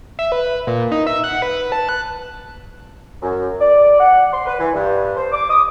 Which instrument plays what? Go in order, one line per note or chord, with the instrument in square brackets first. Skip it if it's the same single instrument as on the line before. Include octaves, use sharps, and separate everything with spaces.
[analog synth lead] E5
B4
A#2
D#4
E5
F#5
B4
A5
F#6
[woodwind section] F#2
D5
F#5
C6
B4
E3
G2
C5
D6
D#6